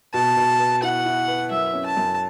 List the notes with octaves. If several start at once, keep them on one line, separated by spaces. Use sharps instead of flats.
B2 A5
B2
B4
E4 F#5
E4
B4
F#2 E5
C#4
A5
F#2